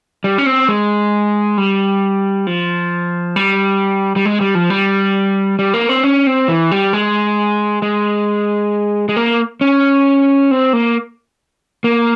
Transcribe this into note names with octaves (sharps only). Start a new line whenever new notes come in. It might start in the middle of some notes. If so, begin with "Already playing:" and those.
G3
C#4
C4
G#3
G3
F3
G3
G3
G#3
G3
F3
G3
G3
A#3
C4
C#4
C4
E3
G3
G#3
G#3
G#3
A#3
C#4
C4
A#3
A#3